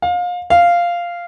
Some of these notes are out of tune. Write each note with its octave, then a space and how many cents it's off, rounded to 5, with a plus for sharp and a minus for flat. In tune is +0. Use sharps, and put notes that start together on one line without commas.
F5 +30
F5 -5